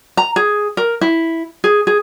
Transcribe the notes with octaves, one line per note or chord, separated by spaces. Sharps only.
A#5
G#4
A#4
E4
G#4
G#4